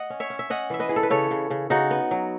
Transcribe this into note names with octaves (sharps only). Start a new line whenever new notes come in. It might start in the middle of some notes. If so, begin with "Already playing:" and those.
Already playing: D#5 F#5
C#4
C#5 E5
C#4
E5
C#4 D#5 F#5
E3 E5
B4 D#5
E3 G#4
A4
B4
C#3 A4 C#5
C#3
C#3
C#3 D#4 F#4
B3
F#3